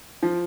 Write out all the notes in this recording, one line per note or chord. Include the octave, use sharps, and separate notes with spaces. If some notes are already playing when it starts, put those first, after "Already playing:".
F3